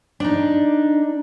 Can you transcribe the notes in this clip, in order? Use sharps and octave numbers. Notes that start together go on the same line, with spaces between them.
D4 D#4